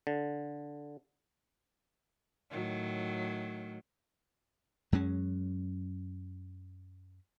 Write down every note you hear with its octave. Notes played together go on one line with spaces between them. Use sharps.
D3
A2 D#3 F#3
F#2 F#3 G#3 C#4